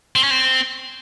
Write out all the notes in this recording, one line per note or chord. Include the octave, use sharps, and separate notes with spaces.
C4
C#4
C4